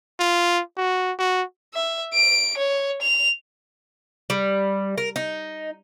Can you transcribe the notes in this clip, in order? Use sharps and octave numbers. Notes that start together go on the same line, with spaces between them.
F4
F#4
F#4
E5
D7
C#5
F7
G3
A#4
D#4